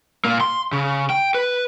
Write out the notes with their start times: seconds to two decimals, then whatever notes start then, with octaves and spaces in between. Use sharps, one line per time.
0.25 A#2 A#3
0.41 C6
0.72 C#3
1.10 G5
1.34 B4